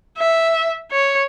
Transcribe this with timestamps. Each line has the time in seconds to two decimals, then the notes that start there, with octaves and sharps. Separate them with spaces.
0.18 E5
0.91 C#5